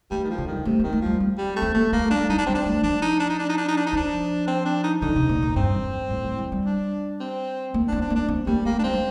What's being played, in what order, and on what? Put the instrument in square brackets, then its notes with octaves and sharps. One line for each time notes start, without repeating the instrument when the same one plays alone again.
[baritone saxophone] G3 [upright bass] A3
[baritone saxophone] D#3
F3
[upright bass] D3
[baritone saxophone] D#3 [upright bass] G3
[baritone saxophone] C3 [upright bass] A3
[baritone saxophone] D#3 [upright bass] A#3
[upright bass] A3
[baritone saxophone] F3 [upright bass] G3
[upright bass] C4
[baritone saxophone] G3
A3
[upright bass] C4
[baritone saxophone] A3 [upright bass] A#3
[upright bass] A3 [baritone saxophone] A#3
[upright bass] G3 [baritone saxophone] D4
[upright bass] G3 [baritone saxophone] D#4
[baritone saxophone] D4
[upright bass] G3 [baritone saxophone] C4
[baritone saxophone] D4
[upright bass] A3
D#3
[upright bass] F3 [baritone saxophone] D4
[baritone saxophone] D#4
D4
D#4
D4
D#4
D4
D#4
D4
D#4
[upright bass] F3 [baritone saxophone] D4
[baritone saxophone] C4
D4
D#4
[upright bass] D3 [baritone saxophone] D#4
[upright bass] C3
A#2
A#2
[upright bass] G2 [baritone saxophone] C4
[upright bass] F2
G2
A2
G3
G3
G3
[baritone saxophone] D4
C4
[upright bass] A#3
[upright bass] C4 [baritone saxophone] D4
[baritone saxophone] D4
[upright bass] A#3
[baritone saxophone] D4
[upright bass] C4
[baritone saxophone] G3 [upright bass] A#3
[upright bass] A3 [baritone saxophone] A#3
[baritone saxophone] D4
[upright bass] G3 [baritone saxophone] C4
[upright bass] G3